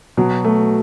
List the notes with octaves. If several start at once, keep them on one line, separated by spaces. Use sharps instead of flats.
B2 F#3
A3